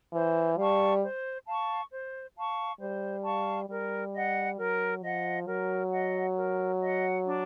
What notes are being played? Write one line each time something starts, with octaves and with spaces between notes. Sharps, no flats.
E3 C5
G3 F5 A5 C#6
C5
F5 A5 C#6
C5
F5 A5 C#6
G3 C5
F5 A5 C#6
G3 A#4
D#5 F#5
F#3 A#4
F3 D#5 F#5
F#3 A#4
D#5 F#5
A#4
D#5 F#5
D4